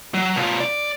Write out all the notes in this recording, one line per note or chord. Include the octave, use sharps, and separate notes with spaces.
F#3
B2 F4
D5